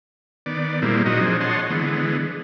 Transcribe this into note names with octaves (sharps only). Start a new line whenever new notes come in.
D#3 B3 D5
A#2 G3 G#3 A#3 C4 E4
A#2 F#3 D#4 F#4 D#5
F3 C4 D4 G#4
C#5 D#5 F#5 A5 C6
D3 E3 G#3 B3